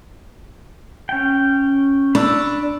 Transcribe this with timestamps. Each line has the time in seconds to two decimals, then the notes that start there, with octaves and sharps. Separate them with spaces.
1.09 C#4 G5
2.15 D4 B5 C#6 E6